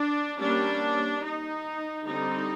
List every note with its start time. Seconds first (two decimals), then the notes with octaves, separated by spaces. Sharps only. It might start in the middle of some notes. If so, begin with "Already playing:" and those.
Already playing: D4
0.39 G3 A#3 C#4 D4
1.22 D#4
2.05 D3 G3 C4 D#4